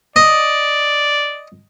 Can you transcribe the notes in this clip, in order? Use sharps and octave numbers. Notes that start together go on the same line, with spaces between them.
D5 D#5